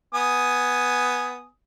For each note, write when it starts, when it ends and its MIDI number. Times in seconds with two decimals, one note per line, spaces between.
0.15 1.46 59
0.15 1.46 80
0.15 1.46 87